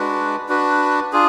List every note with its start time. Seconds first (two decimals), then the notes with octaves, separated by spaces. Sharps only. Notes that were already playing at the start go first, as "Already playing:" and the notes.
Already playing: G#3 D4 F#4 B4
0.49 D4 F#4 B4
1.12 D4 F4 G#4